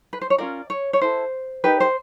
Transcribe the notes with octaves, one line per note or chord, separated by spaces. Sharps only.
B4
C5
C#5
C#4 F4 A#4 D5
C#5
C#5
E4 A4 C5
D#4 G4 A#4 B4
C5